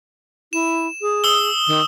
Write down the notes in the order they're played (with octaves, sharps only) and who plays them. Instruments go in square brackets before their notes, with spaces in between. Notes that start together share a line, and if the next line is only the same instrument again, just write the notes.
[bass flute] E4 [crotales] E7
[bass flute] G#4
[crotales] D#6 E6 G7
[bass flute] D#3